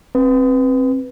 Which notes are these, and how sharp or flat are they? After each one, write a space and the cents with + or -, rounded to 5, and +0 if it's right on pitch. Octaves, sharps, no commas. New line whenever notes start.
C4 +20 B4 +0